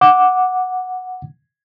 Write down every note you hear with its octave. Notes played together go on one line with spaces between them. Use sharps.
F#5 D6